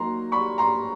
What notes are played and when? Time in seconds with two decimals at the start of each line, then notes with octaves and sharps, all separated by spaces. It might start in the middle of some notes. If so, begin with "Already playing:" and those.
Already playing: F#3 A#3 D#4 A#5 C6
0.32 B5 C#6
0.58 A#5 C6